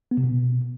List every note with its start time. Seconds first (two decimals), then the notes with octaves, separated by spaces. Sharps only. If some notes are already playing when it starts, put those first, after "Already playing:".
0.11 B3
0.17 C3
0.24 B2